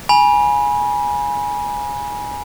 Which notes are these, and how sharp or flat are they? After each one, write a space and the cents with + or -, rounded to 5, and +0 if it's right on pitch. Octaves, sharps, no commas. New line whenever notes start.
G#5 +0 B5 -30